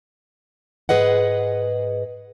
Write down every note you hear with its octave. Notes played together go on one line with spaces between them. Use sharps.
G#2 G#4 B4 D#5 F#5